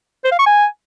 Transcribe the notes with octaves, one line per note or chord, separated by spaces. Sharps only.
C5
F5
C#6
G#5